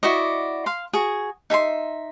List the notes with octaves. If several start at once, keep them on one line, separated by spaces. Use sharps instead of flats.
E4 F#4 D5 D#5
F5 C6
F#4 G#4
D#4 E5 G#5 C6